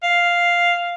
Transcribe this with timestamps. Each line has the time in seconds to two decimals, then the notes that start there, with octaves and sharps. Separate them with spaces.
0.03 F5